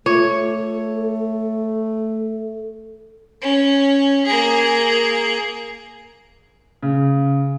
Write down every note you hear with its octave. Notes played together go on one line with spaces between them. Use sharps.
A3 F4 A4 C#5
C#4
A#3 G#4
C#3